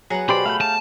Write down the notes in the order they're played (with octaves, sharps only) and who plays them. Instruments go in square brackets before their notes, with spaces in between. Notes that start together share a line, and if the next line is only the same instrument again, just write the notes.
[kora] F#3 B3 [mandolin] G#4 F#5 A#5
[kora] B2 B4 [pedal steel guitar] G4 C5 D5 [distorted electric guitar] B5
[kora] A3 G4 [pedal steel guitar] F5 G6
[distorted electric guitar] A5